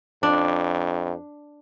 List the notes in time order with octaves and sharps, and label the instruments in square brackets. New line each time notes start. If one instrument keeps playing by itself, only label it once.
[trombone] F2 [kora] D4